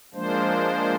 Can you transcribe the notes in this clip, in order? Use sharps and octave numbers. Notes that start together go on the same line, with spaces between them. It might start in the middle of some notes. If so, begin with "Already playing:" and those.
F3 G#3 A#3 D4 C5